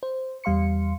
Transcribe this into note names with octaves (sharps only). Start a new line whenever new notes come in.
C5
E2 G3 F5 C6 C#7